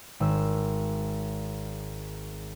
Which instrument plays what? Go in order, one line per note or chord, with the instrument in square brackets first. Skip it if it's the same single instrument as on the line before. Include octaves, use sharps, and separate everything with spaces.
[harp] G#1 E6